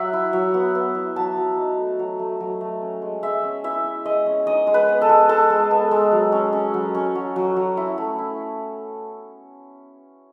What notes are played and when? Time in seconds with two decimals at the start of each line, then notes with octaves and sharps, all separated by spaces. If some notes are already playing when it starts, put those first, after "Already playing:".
Already playing: F#3 E5 F#5
0.13 E4
0.33 F#3
0.54 B3
0.75 B3
0.95 E4
1.16 F#3 A5
1.37 F#3
1.57 D#4
1.78 A3
1.99 F#3
2.19 A3
2.40 F#3
2.61 A3
2.81 C#4
3.02 G#3
3.23 G#3 E5
3.43 C#4
3.64 E4 E5
3.84 E4
4.05 G#3 D#5
4.26 C#4
4.47 D#4 D#5
4.67 G#3
4.74 B4
4.89 B3
5.01 A4
5.09 G#3
5.29 G#3 A4
5.50 G#3
5.71 B3
5.91 G#3
6.12 F#3
6.32 C#4
6.53 C#4
6.74 F#3
6.94 C#4
7.15 F#3
7.36 F#3
7.56 F#3
7.77 E4
7.98 A3
8.19 E4